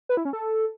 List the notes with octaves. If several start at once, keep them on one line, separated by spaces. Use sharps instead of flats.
B4
E4
C#4
A4